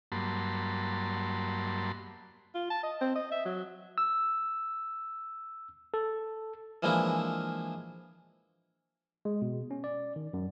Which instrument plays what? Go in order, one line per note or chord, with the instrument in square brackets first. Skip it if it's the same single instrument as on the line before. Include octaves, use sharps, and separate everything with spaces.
[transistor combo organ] G2 F#3 A#3 A5 B5 C6
[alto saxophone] F4
A5
D#5
C4
D#5
E5
F#3
[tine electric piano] E6
A4
[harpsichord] E3 F3 G#3 A#3 D4 E4
[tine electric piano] G#3
B2
C#4
D5
D#3
F#2